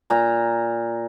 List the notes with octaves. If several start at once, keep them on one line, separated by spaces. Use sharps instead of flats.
A#2 A#5